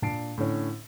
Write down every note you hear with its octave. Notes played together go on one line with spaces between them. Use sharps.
A#2 D4 A5 C7 D7
A2 D3 C#4